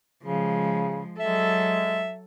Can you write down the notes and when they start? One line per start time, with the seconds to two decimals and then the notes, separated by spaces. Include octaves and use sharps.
0.23 C#3 F3 G#3
1.20 F#3 G#3 A4 E5